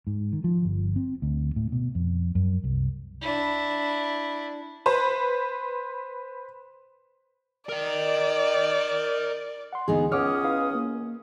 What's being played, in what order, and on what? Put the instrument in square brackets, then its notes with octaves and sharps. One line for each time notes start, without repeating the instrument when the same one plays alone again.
[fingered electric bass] G#2
D#3
F3
G1
C4
D2
A2
B2
F2
F#2
C2
[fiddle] D4 E4
[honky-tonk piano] B4 C5
[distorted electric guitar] A#4 D#5 [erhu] D5
[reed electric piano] F#5 C6
[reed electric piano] D2 D3 E3 [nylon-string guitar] B3 D#4 G#4
[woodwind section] C#2 C#4 D#6 [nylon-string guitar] C#5 [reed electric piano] F#5 D6 F6
[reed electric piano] E4 B4 F5
A#3